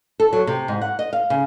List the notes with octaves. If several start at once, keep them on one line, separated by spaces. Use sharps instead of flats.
A4
F#3
C3
G#2
F#5
D#5
F5
C#3